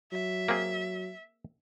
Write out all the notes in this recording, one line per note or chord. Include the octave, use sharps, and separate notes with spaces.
F#3 E5
A#3 C4 G#4